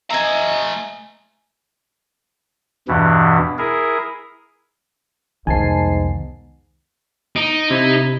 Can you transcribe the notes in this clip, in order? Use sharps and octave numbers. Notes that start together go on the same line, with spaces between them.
A3 D#5 E5 G#5 A#5
E2 G2 B2 E3
E4 G#4 A#4
C2 F2 G#2 D#3 B3 G#5 A5 C7
D#4 D7
C3 E4